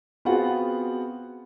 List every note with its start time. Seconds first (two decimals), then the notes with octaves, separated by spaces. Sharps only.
0.25 B3 C4 F4 F#4 G#4 F#5